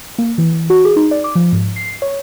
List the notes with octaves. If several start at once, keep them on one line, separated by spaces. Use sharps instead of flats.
A#3
E3
E3
F#4
G#4
D#4
D5
D6
F3
G#2
C7
C#5